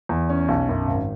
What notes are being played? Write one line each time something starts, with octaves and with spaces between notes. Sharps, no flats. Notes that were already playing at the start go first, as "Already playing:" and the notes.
E2
C#4
B1
F#2
G#1